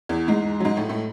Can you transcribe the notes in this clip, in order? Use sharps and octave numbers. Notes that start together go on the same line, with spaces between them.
E2 E3
G#2 G#3
F#3
G#2 G#3
A2 A3
A2 A3